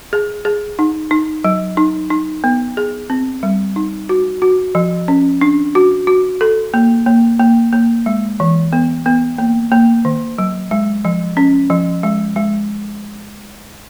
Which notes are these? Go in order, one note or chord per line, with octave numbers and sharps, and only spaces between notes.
G#4
G#4
D#4
D#4
F#3
D#4
D#4
B3
G#4
C4
G3
D#4
F#4
F#4
F3
C#4
D4
F#4
F#4
A4
A#3
A#3
A#3
A#3
G#3
E3
B3
B3
A#3
A#3
D#3
F#3
G#3
F3
C#4
F3
G#3
G#3